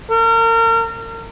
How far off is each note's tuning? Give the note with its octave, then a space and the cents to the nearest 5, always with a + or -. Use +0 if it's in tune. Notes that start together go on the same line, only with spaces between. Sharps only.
A#4 -35